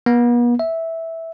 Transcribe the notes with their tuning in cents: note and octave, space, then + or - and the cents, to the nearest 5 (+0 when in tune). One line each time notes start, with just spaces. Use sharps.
B3 -45
E5 -10